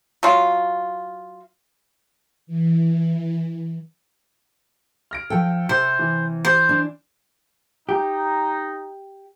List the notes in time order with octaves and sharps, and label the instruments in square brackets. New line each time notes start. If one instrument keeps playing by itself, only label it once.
[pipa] F#3 F4
[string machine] E3
[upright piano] F6 A#6 D7
[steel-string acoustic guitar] F3 G5 [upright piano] A4
[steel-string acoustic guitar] C3 [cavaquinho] C5
[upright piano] E3
[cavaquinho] C5
[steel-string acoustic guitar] D4
[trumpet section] D#4 [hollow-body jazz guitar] G4